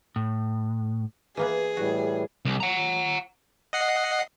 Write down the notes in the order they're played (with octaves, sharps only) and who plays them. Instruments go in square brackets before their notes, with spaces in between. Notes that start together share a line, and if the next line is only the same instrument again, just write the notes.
[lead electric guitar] A2
[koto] E3 A#3 B3 [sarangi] G#4
[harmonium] A2 E3 G3 [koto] F#4
[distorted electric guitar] C2
F#5 A#5
[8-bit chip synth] D#5 F#5 C7